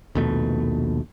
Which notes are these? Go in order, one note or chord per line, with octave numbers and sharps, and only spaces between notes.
A#1 D#2 B2 A3